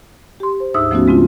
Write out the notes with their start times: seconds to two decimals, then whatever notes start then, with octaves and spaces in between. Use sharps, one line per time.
0.40 G4 C6
0.60 C5
0.74 D2 G#2 D#4 E5 D#6 E6
0.91 F3 A3 B3 C#4 D#4 F#4
1.07 C#3 G#3 C4 D4 F4